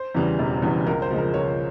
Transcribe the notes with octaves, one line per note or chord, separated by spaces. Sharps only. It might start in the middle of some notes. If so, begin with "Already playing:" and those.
Already playing: C5
E2 C#3 E3 G3
E1
E2 C#3 E3 G3
C#2 A#4
C5
C#3 F3 G#3
A#4
C#2 A#4 C#5